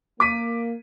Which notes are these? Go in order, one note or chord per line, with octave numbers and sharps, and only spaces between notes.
A#3 D6 B6 D#7